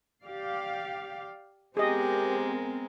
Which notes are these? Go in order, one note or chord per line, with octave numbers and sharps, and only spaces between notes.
G4 D5 F5
G#3 B3 C4 G4 G#4 A#4 D#5